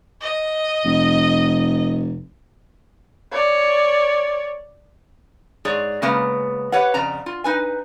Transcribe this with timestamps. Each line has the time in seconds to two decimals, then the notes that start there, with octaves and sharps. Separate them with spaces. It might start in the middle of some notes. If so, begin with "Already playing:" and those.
0.21 D#5
0.85 F1
3.32 C#5 D5
5.65 G#2 G#4 C#5 D5
6.02 C#3 G#3 A#3 B3
6.72 G4 B4 C#5 F#5
6.94 F2 C#3 D5 A#5
7.26 F4
7.44 D#4 B4 G#5